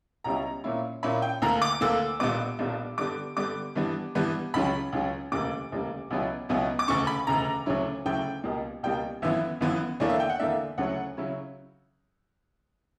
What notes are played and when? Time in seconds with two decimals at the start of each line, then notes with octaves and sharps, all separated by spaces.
0.24 C#2 B2 G3 C#4 E4 A#5
0.64 A#2 A#3 C#4 E4
1.03 A#2 A#3 C#4 E4 B5
1.22 G5
1.42 D2 D3 A#3 A#5
1.62 D6
1.81 D2 D3 A#3 E6
2.19 B1 A#2 G3 B3 D4 D6
2.59 B1 A#2 G3 B3 D4
2.98 G2 D3 G3 B3 D4 D6
3.37 G2 D3 G3 B3 D4 D6
3.75 G2 E3 G3 B3 D4
4.15 G2 E3 G3 B3 D4
4.54 C#2 C#3 F#3 B5
4.93 C#2 C#3 F#3
5.32 E1 D2 C#3 G3 A#3 D6
5.72 E1 D2 C#3 G3 A#3
6.10 C#2 B2 F#3 B3 E4
6.49 C#2 B2 F#3 B3 E4
6.79 D6
6.88 E1 D2 C#3 C#6
7.07 B5
7.27 E1 D2 C#3 A#5
7.66 D2 C#3 F#3 C#4 E4
8.05 D2 C#3 F#3 C#4 E4 G5
8.44 C#2 B2 G3 A#3
8.83 C#2 B2 G3 A#3 G5
9.22 G1 F#2 E3 B3 E5
9.61 G1 F#2 E3 B3
10.00 E2 D3 A#3 D4 C#5
10.10 E5
10.20 G5
10.30 F#5
10.39 E2 D3 A#3 D4 E5
10.78 D2 C#3 F#3 C#4 E4 F#5
11.17 C#3 F#3 C#4 E4